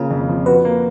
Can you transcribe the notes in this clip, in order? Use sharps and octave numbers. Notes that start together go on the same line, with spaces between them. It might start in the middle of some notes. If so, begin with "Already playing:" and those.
Already playing: C#3 A#3 F4
F2
F3
F#4 B4
A#3